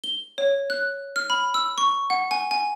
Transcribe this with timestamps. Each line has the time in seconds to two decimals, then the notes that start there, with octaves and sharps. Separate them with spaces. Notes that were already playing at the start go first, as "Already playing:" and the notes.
0.04 G7
0.38 C#5
0.70 F#6
1.16 F6
1.30 B5
1.54 E6
1.78 C#6
2.10 F#5
2.31 G#5
2.51 G#5